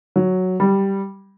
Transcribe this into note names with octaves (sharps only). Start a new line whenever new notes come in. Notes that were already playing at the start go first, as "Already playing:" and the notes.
F#3
G3